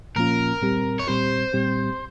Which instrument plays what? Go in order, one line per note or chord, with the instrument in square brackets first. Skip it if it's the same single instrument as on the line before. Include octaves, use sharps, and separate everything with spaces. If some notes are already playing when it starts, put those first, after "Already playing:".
[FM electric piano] A#2 F3 A#3 C#4 F4 [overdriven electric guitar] A#4
[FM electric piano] A#2 G3 C4 G4
[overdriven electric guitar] C#5
[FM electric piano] A#2 G3 C4 G4 [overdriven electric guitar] C5
[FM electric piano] A#2 G3 C4 G4